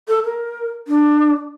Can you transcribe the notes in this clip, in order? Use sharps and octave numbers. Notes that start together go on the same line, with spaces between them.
A4
A#4
D4